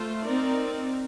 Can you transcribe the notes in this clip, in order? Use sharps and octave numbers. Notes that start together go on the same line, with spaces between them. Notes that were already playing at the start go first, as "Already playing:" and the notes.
Already playing: A3 F4 C5
C4 D#4 A#4 D5